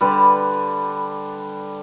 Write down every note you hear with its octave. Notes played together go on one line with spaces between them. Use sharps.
D3 G3 B4